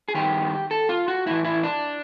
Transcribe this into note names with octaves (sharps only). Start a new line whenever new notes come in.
G#4
G2 D#3 G4
A4
F4
F#4
A2 E3 E4
E4
D4